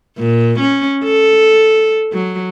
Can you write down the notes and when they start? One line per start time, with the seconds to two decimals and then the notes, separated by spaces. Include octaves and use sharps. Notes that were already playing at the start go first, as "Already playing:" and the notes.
0.18 A#2
0.59 C#4
1.04 A4
2.12 F#3